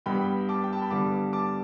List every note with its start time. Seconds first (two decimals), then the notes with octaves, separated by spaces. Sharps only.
0.06 G2 G3 B3 G5 B5
0.49 A5 D6
0.64 G5
0.73 A5
0.82 B5
0.91 G2 D3 G3 B3 A5 D6
1.33 A5 D6